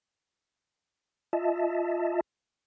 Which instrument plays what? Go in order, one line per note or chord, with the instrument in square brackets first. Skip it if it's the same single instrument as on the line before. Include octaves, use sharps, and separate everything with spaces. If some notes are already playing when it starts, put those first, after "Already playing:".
[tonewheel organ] F4 D#5 E5 A5